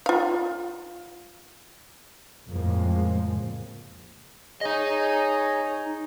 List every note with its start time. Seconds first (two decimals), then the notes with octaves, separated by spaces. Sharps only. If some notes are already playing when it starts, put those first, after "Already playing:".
0.06 F4 F5
2.49 F2 A2 C#3 F3 G#3 A#3
4.61 D#4 G#4 C#5 D#5